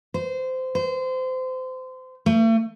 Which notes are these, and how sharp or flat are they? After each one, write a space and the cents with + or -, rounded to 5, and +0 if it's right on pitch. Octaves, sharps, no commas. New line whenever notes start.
C5 -20
C5 -25
A3 +40